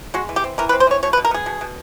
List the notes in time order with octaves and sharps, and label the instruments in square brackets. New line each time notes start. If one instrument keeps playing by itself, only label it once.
[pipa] G#3 F#4
E3
G4
C4
E3 A#4
B4
C4
C5
E3 C#5
B2 C#5
B4
B2
A#4
B3 G#4
B2
B2